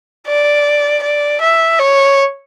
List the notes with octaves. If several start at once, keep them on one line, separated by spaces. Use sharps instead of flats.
D5
D5
E5
C#5